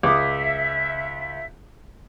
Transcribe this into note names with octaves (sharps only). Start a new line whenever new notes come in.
C#2 E5 D6 D#6